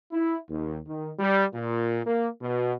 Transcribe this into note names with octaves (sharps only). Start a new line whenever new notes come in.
E4
D#2
D#3
G3
A#2
A#3
B2